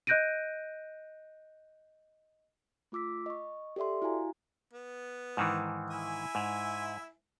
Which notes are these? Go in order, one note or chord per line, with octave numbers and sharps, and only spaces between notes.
D#5 F#6 G6 A#6 D7 D#7
A3 F4 D6 E6 B6
D#5 C#6
G4 A4 D5 E5 C6
E4 F#4 F5 G#5 A#5
B3
G#2 D#3 E3
E4 E5 G#5
G#2